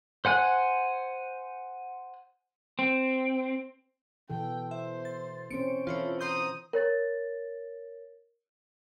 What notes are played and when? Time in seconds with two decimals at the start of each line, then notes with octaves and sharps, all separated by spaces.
0.25 C5 F#5 G#5 F#6
2.79 C4
4.30 B2 E3 A4 G5
4.71 C5 E5
5.05 A6
5.51 C4 C#4 C5 C#7 D7
5.87 E3 E4 F4 A4 C5 C#5
6.21 C5 A#5 C6 D#6 G6
6.73 A#4 C#5 A6